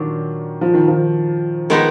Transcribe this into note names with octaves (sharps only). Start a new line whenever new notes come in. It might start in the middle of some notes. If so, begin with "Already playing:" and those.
Already playing: A#2 D#3 F#3 D4
F3
D#3
F3
D#3 G#3 B3 D#4